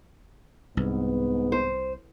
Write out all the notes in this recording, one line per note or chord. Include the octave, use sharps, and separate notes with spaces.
C2 G#2 B3
C5